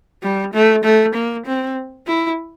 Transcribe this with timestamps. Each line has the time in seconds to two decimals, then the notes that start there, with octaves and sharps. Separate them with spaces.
0.23 G3
0.54 A3
0.84 A3
1.15 A#3
1.46 C4
2.07 E4